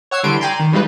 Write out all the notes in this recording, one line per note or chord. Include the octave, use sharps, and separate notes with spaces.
C#5 F#5 E6 G#6 C7
D3 E3 G3 C6 D7
D5 G5 G#5 A#5 C6
D#3
E3 G3 G#3 D#4 F4 B4